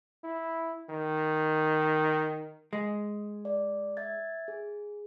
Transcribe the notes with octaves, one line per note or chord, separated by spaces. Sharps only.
E4
D#3
G#3
D5
E5 G#6 A6
G#4